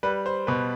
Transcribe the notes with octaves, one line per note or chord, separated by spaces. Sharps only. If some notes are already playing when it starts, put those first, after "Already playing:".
G3 B4
C5
B2 B4